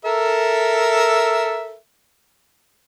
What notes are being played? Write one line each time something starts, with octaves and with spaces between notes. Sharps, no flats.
A4 A#4 E5